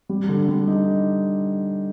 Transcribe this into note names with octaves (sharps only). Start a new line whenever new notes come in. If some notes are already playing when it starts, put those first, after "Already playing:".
G3
D3
G3
D#4